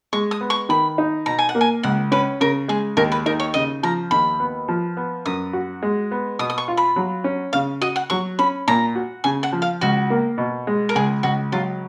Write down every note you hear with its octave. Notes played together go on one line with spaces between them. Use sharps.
G#3 C#6
D#6
B3
C#6
D#3 B5
D#4
B2 A#5
G#5
F#5
A#3
G#5
C#2 F#5
C#4 B4
C#3 A#4
G#3 G#4
D#2 A#4
B4
D#4 A#4
C#5
C#3 D#5
F3 A#5
D#2 B5
B3
F3
B3
F#2 D#6
F#4
G#3
B3
B2 D#6
D#6
C#6
F4
B5
F#3
C#4
C#3 F5
F#4 D#5
F#5
F#3 C#6
C#4 B5
A#2 A#5
F#4
C#3 G#5
F#5
F3
F5
C#2 F#4
A#3
B2
G#3
A#4
C#2 G#4
C#2 F#4
F#3 F4